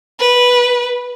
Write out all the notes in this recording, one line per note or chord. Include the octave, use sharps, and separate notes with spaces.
B4